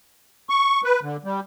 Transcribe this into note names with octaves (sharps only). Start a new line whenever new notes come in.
C#6
B4
D3
G3